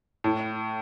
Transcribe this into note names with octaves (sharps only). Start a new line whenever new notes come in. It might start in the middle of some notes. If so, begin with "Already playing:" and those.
A2